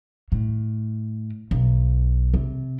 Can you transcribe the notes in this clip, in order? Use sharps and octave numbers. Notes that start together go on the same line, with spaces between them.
A2
B1
C3